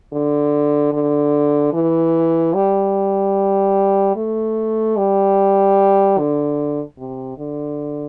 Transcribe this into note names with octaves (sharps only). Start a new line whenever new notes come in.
D3
D3
E3
G3
A3
G3
D3
C3
D3